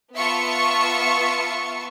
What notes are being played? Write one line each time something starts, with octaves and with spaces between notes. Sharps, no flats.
B3 F4 E5 A5 C#6 C#7